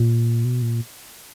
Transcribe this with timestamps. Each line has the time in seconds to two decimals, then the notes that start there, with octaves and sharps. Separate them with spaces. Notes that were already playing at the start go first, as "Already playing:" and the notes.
Already playing: A#2
0.45 B2
0.62 A#2